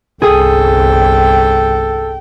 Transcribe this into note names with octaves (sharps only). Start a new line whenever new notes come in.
G1 C2 G#4 A4 G5 D#6